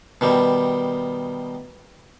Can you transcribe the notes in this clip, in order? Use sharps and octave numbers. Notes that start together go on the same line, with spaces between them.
B2 D#3 G3